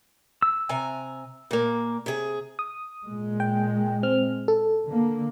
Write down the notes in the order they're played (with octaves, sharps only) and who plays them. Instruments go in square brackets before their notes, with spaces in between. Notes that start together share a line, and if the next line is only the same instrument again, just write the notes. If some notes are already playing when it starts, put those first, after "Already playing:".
[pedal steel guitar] E6
[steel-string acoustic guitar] C3 G#5 A#5
A#2 A#3
C3 G#4
[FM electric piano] D#6
[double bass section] A#2 G#3
[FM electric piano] G5
C4 F6
A4
[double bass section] D3 A#3